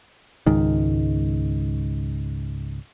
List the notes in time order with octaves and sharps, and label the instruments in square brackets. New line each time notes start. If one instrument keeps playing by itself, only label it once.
[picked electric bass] C#2 G#2 D#3